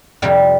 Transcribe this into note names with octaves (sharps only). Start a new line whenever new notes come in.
F2 C3 F3 G3